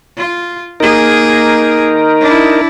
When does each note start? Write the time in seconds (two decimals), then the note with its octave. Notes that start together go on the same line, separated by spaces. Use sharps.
0.17 F4
0.80 A#3 D#4 G#4 A#4
2.20 D4 E4